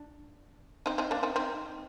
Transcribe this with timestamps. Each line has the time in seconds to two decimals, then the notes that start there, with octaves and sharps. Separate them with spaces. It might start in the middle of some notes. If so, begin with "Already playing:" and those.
Already playing: D4
0.86 C4 D#4
0.98 C4 D#4
1.11 A#3 D4
1.23 C4 D#4
1.36 C4 D#4